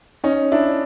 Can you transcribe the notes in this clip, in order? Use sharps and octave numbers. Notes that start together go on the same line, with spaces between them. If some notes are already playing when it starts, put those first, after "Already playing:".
C#4 D#4
D4 E4